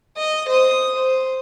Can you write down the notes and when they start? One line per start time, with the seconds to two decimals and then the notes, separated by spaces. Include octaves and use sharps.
0.17 D#5
0.49 C5 D#6
0.95 C5